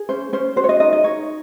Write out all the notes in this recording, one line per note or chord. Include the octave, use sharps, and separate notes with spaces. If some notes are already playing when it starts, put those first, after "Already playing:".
Already playing: G#4
C#4 C5
C#4 C5
F#4 C5
C#5
D#5
D#4 D#5
D#5
D#4 C#5